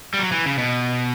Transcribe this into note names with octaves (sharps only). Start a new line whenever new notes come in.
G3
F#3
E3
C#3
B2